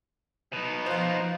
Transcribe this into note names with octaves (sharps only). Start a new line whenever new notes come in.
B2 B3 D#4
F3 F4 F#4 C5 F5